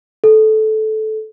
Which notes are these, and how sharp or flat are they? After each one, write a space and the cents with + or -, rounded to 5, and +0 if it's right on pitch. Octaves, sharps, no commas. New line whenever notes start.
A4 -15